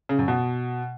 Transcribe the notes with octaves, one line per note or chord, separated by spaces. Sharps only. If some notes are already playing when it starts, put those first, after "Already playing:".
C#3
F#2
B2